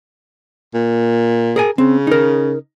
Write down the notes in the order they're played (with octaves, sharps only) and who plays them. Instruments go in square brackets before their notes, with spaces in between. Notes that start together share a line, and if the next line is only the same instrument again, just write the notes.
[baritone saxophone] A#2
[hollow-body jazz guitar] G#4 A#4 G#5
[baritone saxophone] C#3 [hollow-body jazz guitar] C4
[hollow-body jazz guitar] D#4 A#4